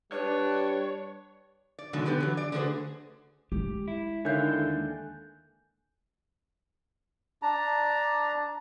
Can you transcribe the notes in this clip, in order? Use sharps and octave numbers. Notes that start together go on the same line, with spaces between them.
G3 D4 B4 C#5
D5
B2 D3 D#3 F#3 G#3
D3 B3 G4 B4
E3 F#3
D5
D3 A3 F#4 G#4 B4 C5
G#3 G4
E4
D3 D#3 E4 C#5 F5 G#5 F#6 G6
D#2 A4
D4 A5 A#5